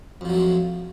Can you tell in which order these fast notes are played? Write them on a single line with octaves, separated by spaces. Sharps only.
F2 F3 F#3 A3 G#3